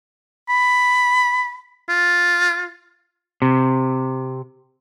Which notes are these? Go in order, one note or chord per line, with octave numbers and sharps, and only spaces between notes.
B5
F4
C3